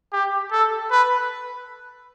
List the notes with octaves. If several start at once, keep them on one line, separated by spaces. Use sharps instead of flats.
G4
A4
B4